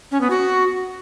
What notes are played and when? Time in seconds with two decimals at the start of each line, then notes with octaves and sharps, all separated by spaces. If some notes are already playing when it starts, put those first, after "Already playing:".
0.11 C#4
0.21 B3
0.30 F#4